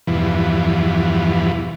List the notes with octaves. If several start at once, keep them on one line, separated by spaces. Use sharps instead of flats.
E2 G2 B2 E3 F3